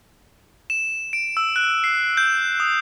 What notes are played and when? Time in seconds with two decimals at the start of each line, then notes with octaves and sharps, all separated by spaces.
0.70 E7
1.13 D7
1.37 E6
1.56 F#6
1.84 C7
2.17 G6
2.60 D#6